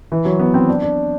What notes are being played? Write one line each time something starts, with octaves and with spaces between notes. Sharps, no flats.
E3
F#3
B3
C4
D4
D4